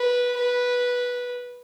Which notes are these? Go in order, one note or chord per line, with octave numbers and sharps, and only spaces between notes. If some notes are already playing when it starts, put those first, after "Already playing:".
Already playing: B4
B4